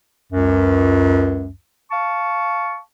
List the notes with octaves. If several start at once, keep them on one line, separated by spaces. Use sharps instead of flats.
C#2 F#2
F5 A5 C#6